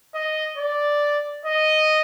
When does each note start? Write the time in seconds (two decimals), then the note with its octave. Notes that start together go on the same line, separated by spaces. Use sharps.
0.15 D#5
0.58 D5
1.46 D#5